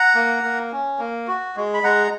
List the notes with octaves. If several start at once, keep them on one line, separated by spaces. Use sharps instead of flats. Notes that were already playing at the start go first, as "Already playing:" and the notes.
Already playing: F#5 A#5
A#3
A#3
C#4
A#3
F#4
G#3
B5
G#3 F#5 A#5